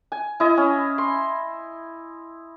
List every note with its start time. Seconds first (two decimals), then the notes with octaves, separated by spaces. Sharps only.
0.12 G#5
0.40 E4 D#5
0.57 C#4
0.98 C6